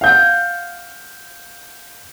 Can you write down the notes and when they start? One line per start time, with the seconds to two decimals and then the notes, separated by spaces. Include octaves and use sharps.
0.01 F5 F#5 G6